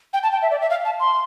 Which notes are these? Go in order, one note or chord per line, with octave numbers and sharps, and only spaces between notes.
G5
A5
G5
E5
D5
E5
F5
A5
C6